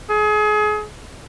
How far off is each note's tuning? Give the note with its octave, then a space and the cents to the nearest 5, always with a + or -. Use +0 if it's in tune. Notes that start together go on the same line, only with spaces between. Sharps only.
G#4 +30